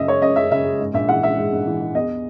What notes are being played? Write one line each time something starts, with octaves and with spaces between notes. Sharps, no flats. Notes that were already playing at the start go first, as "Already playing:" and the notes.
Already playing: F#1 F#2 C#3 D#5 E5
G#3 C#5
F#2 D#5
F#1 E5
C#3 E5
G#3
G#2
A#1 E5
E3 F#5
G#3 E5
G#2
A#1
E3
G#3
E2 D#5